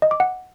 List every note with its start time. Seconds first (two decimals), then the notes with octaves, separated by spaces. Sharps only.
0.02 D#5
0.11 D6
0.20 F#5